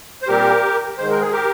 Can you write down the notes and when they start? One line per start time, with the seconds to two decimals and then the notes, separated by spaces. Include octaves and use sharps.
0.22 C5
0.27 A#2 G3 C4 G4 A#4
0.98 G#2 D#3 G#3 C5
1.10 A#4
1.20 G#4
1.32 G4 A#4